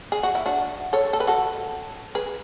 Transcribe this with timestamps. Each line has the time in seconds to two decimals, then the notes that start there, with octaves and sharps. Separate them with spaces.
0.12 G#4
0.23 F#4
0.35 E4
0.46 D4 F#4
0.93 A4 C#5
1.13 A4
1.20 B4
1.27 F#4 A4
2.15 G#4 B4